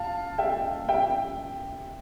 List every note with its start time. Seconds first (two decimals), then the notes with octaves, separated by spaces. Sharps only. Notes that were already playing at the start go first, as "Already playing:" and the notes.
Already playing: F5 A5
0.38 E5 G5
0.89 E5 G5